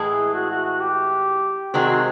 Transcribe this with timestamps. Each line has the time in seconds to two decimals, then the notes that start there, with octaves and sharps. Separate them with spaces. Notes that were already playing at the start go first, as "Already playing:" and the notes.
Already playing: A2 E3 G#3 G#4
0.34 F#4
0.50 F#4
0.65 F#4
0.81 G4
1.74 C3 D#3 G#3 C4 F#4
1.89 F#4